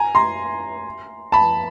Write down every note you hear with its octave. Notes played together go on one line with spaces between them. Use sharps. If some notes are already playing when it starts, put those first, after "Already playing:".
Already playing: G#5 A#5
A#5 C6
A5 B5